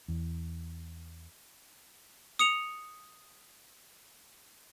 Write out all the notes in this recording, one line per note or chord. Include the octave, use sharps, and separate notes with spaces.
E2
D#6 C#7 F7